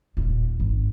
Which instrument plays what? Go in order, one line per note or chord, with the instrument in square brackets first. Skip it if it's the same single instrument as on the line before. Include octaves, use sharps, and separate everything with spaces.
[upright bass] D#1 A#2
G#1